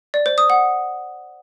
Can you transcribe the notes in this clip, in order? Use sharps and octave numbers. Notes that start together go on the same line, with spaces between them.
D5
C5
D#6
F#5